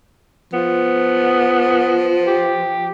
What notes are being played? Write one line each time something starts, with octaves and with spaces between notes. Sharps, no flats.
F3 B3
G4